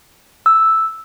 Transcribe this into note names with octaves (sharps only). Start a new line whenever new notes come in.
E6